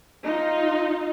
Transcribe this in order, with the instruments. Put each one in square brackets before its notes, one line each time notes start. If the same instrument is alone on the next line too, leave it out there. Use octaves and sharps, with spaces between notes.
[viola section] D#4 F4